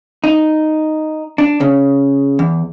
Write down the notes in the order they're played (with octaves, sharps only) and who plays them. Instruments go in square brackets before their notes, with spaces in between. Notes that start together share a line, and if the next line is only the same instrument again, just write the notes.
[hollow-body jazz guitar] D#4
D4
C#3
E2